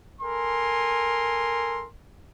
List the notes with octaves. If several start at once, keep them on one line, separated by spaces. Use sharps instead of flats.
A4 A#4 G#5 C6